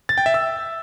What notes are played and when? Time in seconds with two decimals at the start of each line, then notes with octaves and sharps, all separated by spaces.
0.09 A6
0.18 G5
0.26 E5
0.34 E6